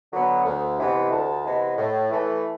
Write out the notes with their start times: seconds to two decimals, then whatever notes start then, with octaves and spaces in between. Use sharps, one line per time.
0.12 D3 F#3 B3
0.44 D2
0.78 C3 E3 G#3 B3
1.11 D2 A5
1.44 C3 E3 G#3 B3
1.77 A2
2.11 E3 A3